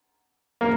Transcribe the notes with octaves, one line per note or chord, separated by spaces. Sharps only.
A#3